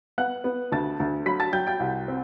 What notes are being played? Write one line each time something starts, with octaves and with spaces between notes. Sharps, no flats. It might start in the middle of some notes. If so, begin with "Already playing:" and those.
B3 F#5 F#6
B3
D2 A5 A6
D2
F#3 B5 B6
A5 A6
F#3 G5 G6
G5 G6
C2
C4